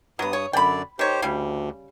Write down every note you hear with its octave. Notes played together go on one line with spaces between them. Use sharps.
G2 F#3 B3 D#6
C#5
F#2 D3 D5 G5 B5
D#3 G4 C5 C#5
D2 C#3 G3